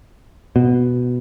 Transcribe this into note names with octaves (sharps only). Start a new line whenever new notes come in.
B2